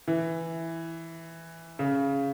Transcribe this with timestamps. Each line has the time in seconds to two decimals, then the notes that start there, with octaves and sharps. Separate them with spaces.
0.08 E3
1.79 C#3